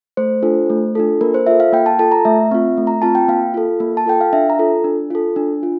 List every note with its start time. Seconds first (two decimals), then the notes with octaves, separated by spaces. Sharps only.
0.17 A3 C5
0.43 D4 F4 A4
0.70 A3
0.95 D4 F4 A4
1.21 A#3 A#4
1.34 C5
1.46 F4 A4 E5
1.60 F5
1.72 A#3 G5
1.86 A5
1.99 F4 A4 A5
2.12 A#5
2.25 A3 E5
2.51 C4 F4
2.77 A3
2.87 A#5
3.02 C4 F4 A5
3.15 G5
3.28 A#3 F5
3.54 F4 A4
3.80 A#3
3.97 A5
4.06 F4 A4 G5
4.21 F5
4.33 D4 E5
4.50 A#5
4.59 F4 A4
4.84 D4
5.10 F4 A4
5.36 D4
5.63 F4